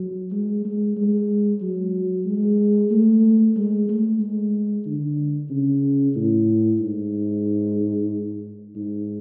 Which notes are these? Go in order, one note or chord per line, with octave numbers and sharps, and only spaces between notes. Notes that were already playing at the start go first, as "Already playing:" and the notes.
Already playing: F#3
G#3
G#3
G#3
F#3
G#3
A3
G#3
A3
G#3
D3
C#3
A2
G#2
G#2